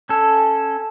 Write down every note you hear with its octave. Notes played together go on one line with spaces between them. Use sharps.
C#4 A4